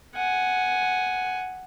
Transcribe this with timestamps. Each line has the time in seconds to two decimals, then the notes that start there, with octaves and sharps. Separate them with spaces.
0.15 F#5 G#5